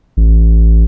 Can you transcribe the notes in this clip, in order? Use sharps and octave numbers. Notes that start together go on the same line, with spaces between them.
A1